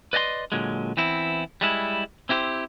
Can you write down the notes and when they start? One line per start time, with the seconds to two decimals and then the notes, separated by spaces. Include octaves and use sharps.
0.13 B4 D5 D#5 G5 C6
0.52 A#2 D3 F#3 G#3
0.97 E3 B3 C4 E4
1.61 G3 G#3 E4
2.29 C4 E4 G4 A#4 C5